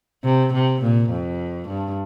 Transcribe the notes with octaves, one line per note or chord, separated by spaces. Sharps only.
C3
C3
A#2
F2
G2